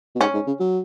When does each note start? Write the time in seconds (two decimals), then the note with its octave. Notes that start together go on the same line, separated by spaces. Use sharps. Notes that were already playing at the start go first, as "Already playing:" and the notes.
0.16 B2
0.21 G#2 C#4
0.34 G#2
0.47 C#3
0.60 F#3